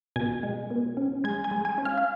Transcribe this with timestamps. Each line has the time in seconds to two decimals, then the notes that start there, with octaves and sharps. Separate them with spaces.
0.16 B2 G#5 G#6
0.43 G#3
0.70 B2
0.97 C#4
1.24 G#3 G#5 G#6
1.44 G#5 G#6
1.51 G#3
1.65 G#5 G#6
1.78 C#4
1.85 F5 F6
1.97 F5